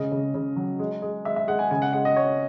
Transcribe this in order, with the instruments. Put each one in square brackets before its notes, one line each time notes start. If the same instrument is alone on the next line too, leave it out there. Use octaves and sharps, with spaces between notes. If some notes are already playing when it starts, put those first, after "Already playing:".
Already playing: [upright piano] C#3 G#3 D#5
C#3
C#3
F#3
G#3
G#3
G#3 E5
E5
G#3 F#5
G#5
C#3 G#5
F#5
G#3 F#5
D#5
G#3 C#5